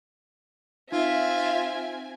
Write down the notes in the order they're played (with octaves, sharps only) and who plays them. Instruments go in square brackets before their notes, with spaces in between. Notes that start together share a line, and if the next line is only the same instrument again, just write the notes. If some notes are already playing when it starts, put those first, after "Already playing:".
[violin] C4 G#5 [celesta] D#4 [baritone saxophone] F4 [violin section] E5